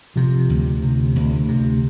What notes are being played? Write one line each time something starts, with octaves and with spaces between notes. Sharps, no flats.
C3 F3
D2
C3
D2
C3